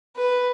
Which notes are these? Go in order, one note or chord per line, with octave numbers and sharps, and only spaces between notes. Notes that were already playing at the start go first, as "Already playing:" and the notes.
B4